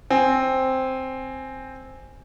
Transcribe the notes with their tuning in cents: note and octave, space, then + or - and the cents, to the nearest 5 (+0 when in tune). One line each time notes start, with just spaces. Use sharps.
C4 +0 G#5 +0